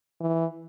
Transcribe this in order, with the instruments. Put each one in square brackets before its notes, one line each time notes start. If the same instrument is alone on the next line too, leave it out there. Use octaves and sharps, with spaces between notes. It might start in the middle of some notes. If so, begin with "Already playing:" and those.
[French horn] E3